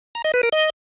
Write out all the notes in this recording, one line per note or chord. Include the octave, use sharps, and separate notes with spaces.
A#5
D#5
B4
A#4
D#5